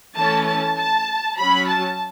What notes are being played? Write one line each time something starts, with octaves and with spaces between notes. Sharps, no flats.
E3 A3 C#4 A5
A5
A5
F#3 C#4 B5
A5